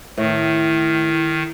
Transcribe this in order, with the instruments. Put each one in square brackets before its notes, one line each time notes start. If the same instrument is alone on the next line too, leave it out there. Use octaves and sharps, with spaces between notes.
[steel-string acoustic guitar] A2 [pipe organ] D#3